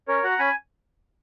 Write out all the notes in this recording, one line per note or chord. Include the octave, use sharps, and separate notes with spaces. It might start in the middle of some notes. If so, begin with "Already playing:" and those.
C#4 A#4 C#5
F#4 F#5 A#5
C#4 G#5 B5